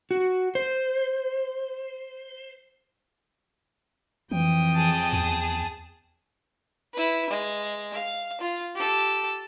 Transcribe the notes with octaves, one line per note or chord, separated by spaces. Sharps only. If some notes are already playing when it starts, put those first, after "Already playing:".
F#4
C5
F2 E3 G5 D#6
G#4 A5
E2
E4 B4
G#3
F5
F4
G4 A4